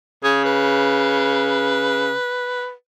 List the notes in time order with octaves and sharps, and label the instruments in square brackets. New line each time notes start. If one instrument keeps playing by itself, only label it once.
[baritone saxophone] C#3 [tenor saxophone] G#4
[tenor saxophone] B4